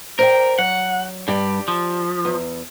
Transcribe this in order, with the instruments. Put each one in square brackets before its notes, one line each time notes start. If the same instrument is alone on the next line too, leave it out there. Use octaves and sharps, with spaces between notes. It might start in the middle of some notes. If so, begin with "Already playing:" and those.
[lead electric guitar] A#4 [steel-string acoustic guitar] C5 D5 G5
[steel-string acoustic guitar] F#3 [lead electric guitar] F#5
[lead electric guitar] G2 [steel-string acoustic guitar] G4 D5
[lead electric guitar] F3
[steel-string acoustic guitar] E2